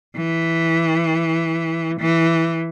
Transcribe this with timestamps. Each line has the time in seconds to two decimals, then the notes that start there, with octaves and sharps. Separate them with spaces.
0.16 E3
2.00 E3